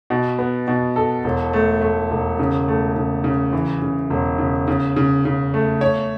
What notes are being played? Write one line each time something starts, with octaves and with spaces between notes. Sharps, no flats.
B2
B3
B2
A4
E1
A3
A3
E1
C#3
A3
C#3
C#3
E3
C#3
E1
C#3
C#3
C#3
C#3
A3
C#5